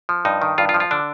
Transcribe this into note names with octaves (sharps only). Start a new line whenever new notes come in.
F3
G2 D#4
D#3
G2 F4
F4
F3
F4
D3 D4